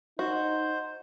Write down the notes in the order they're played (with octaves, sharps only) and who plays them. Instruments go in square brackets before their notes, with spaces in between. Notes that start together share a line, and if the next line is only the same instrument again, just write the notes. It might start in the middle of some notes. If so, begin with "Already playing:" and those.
[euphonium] D#4 [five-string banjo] F#4 [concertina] C5